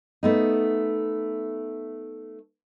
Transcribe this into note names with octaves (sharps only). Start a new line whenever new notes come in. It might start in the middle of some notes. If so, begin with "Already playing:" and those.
A3 B3 D#4